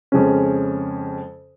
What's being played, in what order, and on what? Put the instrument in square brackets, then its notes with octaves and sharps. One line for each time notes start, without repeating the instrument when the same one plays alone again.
[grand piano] F2 C#3 F3 G#3 C#4